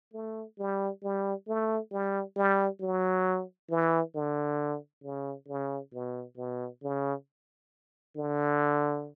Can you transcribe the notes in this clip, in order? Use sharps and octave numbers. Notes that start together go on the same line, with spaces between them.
A3
G3
G3
A3
G3
G3
F#3
E3
D3
C#3
C#3
B2
B2
C#3
D3